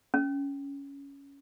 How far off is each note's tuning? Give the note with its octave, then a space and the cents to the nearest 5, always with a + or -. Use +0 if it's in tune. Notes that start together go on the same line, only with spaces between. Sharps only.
C#4 +10